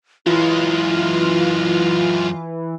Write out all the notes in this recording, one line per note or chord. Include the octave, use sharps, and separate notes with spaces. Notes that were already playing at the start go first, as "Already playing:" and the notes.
F#2 E3 G#3 E4 F4